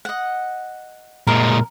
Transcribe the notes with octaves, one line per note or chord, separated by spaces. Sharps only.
D#5 F#5
A#2 G#3 A#4